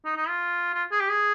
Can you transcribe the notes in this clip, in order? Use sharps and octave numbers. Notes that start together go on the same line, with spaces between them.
D#4
D#4
F4
F4
G#4
G4
G#4